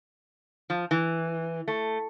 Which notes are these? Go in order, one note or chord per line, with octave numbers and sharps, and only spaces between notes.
F3
E3
A3